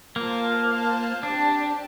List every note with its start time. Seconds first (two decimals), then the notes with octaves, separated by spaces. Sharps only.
0.16 A#3 F4 C5 F5 A5
0.70 F4 C5 F5 A5
1.23 C4 D4 G4 D5 A5